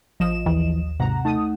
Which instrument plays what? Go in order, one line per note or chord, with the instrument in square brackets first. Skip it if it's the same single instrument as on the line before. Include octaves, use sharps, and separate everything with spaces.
[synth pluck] A1 E7 [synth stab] F3 D#5
[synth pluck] D#2 [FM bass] E3
[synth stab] G#1 A#5 [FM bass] C3 [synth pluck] F#5
[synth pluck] A3 D#4 [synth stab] A5 D#6